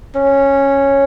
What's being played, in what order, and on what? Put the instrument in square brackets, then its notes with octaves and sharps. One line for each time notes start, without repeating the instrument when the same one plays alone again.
[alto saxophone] C#4